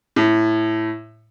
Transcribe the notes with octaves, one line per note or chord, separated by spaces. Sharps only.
A2